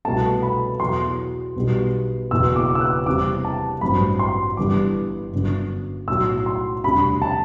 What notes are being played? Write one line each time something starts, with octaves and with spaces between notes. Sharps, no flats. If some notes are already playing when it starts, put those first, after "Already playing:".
C2 B2 A3 A5
B5
E2 B2 F#3 C6
B1 B2 G3
F#1 E2 B2 E6
D6
E6
F#6
E2 C3 G3 D6
A5
A1 G2 F#3 C4 B5
C6
G1 G2 E3 G3 D6
G1 F#2 D3
B1 A2 F#3 E6
C6
E1 D2 C3 G3 D4 B5
A5